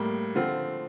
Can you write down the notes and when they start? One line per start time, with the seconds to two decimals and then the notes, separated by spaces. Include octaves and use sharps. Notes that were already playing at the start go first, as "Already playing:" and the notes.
Already playing: A2 G3 A#3
0.35 D3 F3 C4 F4